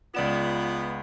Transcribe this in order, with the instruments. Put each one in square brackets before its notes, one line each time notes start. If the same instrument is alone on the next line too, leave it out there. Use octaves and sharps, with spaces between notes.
[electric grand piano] C#2 D5 E7 [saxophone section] B3 [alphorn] F4